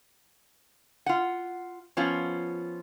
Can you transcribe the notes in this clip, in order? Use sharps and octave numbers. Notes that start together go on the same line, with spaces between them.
F4 F#5
F3 B3 C#4 F4